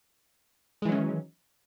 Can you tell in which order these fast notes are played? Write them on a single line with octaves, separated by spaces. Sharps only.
G#3 E3 F#3 C#4 D#3